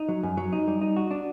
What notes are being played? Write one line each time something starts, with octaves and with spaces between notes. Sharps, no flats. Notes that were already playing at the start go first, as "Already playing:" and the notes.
Already playing: D#4
F#3
F#2
F#3
D#4
G3
D#4
F#4
D4